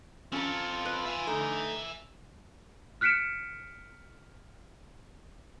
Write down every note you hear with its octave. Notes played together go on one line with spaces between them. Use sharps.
C4 C#4 F4 A4 A#5
B4
E5 G#5
D3 A3 D#4
F6 F#6 B6 C#7 D7 E7